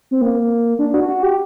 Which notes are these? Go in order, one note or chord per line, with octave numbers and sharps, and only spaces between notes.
C4
A#3
D4
F#4
F#4
G4